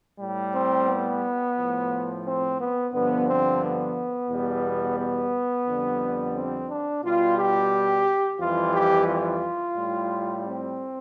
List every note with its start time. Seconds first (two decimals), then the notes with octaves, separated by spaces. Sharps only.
0.20 A2 G3
0.54 C4
0.88 B3
1.57 A2 F3
2.25 C4
2.60 B3
2.92 G2 D3 F3 B3
3.27 C4
3.62 B3
4.29 E2 B2 G3
4.97 B3
5.66 F2 D3 G3
6.34 C4
6.69 D4
7.03 B2 G3 F4
7.38 G4
8.39 F2 E3 G3 F4
8.74 G4
9.08 F4
9.76 A2 G3
10.45 C4